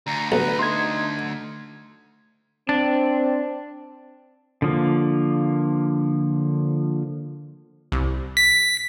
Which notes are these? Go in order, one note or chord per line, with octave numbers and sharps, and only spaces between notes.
D2 A#5
B1 B4 A#5 B5
D#4 C6 G#6
C4 D4
D3 F3 A#3
C2
B6